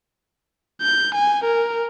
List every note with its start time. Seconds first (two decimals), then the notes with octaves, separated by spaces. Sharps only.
0.82 G6
1.15 G#5
1.45 A#4